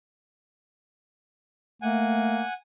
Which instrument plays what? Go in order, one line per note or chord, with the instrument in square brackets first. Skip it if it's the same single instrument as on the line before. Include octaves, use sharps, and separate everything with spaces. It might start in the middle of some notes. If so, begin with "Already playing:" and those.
[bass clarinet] A3 [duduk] A#3 [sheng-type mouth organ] F#5 G#5